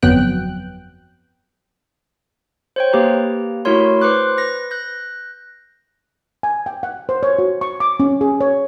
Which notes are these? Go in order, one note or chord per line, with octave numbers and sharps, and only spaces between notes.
G1 F2 F#3 B3 G5 F#6
C5 C#5 G5
A#3 G4 B4 A#5
A3 E4 F#4 A#4 C#5 C6
B4 C5 C6 D6 F#6
B4 A#6
F#6 G6 A#6
G#5
G5
F#5
C5
C#5
F#4
C#6
D6
C#4
G#4
C#5